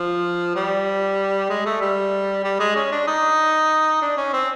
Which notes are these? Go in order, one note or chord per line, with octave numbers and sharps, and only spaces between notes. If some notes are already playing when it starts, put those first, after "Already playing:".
Already playing: F3
G3
G#3
A3
G3
G3
G#3
C#4
D4
D#4
D4
C#4
C4